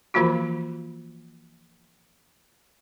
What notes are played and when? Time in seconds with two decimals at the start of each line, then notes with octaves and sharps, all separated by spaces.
0.14 E3 F3 A#3 F4 F#4